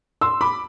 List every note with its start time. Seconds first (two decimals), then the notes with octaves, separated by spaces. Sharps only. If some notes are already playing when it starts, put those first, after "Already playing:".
0.21 C6 E6
0.41 B5 D6